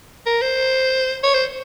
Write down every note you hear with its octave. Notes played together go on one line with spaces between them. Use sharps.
A#4
C5
C#5
C5